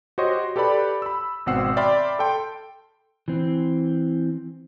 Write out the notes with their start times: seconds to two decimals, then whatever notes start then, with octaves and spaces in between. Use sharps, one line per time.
0.18 F#4 G4 C5 C#5 D#5 C6
0.56 G4 A4 B4 D5 B5
1.02 B5 E6
1.46 G#1 B2 C4 F#5 E6 C7
1.77 D5 E5 G5 B5 C6 F6
2.19 A4 G5 C6
3.28 E3 C4